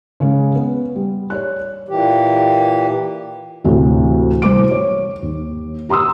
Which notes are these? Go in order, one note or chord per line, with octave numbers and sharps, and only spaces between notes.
C#3 G#3 C#4
B3
G3
C#5 D5 F#6
A#2 E3 G4
D2 A2 C3 E3
C2 C5 D6 D7
C#5
D#2
G4 A#5 C6 D#6 E6